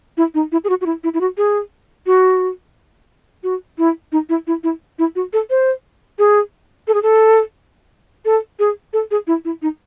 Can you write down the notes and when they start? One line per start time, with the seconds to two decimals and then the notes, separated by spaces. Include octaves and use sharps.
0.17 E4
0.35 D#4
0.52 E4
0.64 G#4
0.69 F#4
0.81 F#4
0.86 E4
1.04 E4
1.14 E4
1.21 F#4
1.38 G#4
2.06 F#4
3.43 F#4
3.78 E4
4.12 D#4
4.29 E4
4.47 E4
4.64 E4
4.99 E4
5.16 F#4
5.33 A4
5.50 C5
6.19 G#4
6.88 A4
6.94 G#4
7.03 A4
8.25 A4
8.59 G#4
8.93 A4
9.11 G#4
9.27 E4
9.45 E4
9.62 D#4